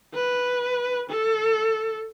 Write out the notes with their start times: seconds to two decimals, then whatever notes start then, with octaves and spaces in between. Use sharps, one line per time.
0.14 B4
1.09 A4